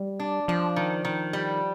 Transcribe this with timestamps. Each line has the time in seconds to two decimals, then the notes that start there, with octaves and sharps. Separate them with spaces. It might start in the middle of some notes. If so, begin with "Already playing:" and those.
Already playing: G3
0.20 D4
0.48 F3 D4
0.76 D#3
1.05 D#3
1.33 G3